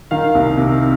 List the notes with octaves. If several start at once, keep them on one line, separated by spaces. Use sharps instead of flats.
D#3 F5
C2
C3